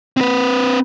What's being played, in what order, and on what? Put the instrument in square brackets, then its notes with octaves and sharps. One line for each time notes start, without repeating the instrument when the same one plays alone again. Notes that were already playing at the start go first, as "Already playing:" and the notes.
[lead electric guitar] C4 B4